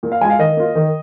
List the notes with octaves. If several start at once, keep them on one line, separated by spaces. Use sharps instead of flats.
A#2
F5
G#3 F4 G#5
F5
D#3 D#5
A#3 F4
D#3